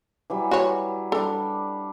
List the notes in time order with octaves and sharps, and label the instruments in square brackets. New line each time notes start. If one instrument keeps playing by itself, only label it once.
[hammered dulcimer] E3 F#3 G3
[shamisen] F#4 C#5
[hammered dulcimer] G3 D4 [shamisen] A4 A#5